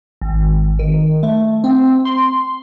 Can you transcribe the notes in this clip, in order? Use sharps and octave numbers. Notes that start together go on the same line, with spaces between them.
G#1
D#3
A3
C4
C6